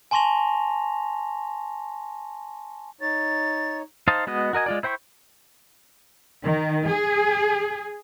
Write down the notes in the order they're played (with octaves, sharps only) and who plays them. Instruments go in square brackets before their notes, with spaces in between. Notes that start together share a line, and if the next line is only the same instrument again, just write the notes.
[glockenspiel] G#5 A5 C6 C#6 A#6 F7
[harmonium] D#4 C#5 [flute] A6
[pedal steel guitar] D#4 C5 D#5 F5 A5
G#3 B3 F#4 D#5
F#4 A#4 D#5 G#5
G#3 F4 D5
E4 C5 G5 B5 C#6
[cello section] D#3
G#4